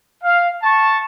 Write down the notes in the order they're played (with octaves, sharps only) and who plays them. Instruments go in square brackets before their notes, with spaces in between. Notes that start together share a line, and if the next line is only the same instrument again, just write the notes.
[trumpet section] F5
A5 C#6